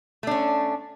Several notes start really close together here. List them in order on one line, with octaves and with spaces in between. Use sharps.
A3 D4 C#4